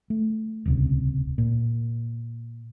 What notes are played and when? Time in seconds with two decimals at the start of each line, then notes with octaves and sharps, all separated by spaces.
0.10 A3
0.66 D#1 C#2 C3
1.38 A#2